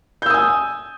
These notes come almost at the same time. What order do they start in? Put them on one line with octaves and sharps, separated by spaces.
G6 E6 D#6 G#5